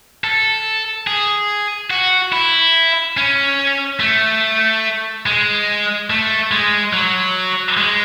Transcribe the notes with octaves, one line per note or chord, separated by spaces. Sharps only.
A4
G#4
F#4
E4
C#4
A3
G#3
A3
G#3
F#3
G#3